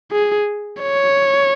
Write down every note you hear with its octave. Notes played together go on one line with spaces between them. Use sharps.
G#4
C#5